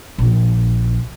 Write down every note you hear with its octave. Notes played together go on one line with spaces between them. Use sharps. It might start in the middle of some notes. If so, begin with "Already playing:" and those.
A#1